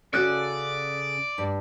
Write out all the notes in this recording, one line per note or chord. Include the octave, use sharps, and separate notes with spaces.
C#3 C#4 F#4 A4 D5 F#6
G2